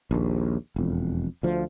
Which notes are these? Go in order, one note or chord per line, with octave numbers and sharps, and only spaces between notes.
A#1 D#2
E1 F2
D2 F3